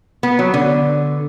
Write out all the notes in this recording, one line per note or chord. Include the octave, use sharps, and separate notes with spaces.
B3
F#3
D3